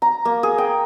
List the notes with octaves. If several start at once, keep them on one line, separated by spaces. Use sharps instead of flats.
A#5
A#3
G#4
G5